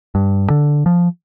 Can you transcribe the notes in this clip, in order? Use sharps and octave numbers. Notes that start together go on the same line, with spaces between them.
G2
D3
F3